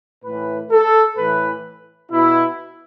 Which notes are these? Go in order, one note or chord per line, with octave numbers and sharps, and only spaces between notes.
A2 E3 B4
A4
A2 E3 B4
B2 E4